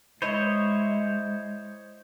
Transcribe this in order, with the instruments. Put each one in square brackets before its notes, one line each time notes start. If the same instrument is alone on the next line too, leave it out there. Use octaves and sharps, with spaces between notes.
[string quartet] G#3 [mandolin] E4 D#5 [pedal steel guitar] C5 C#5